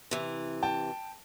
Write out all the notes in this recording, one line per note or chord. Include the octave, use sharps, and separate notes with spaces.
C3 E3
G5 A5